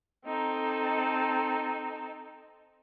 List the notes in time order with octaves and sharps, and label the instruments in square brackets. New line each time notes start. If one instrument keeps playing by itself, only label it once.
[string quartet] C4 D#4 A4